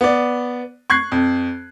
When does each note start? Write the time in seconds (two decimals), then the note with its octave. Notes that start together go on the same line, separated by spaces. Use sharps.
0.01 B3 D5
0.90 C#6 F#6 G#6 C7
1.12 F2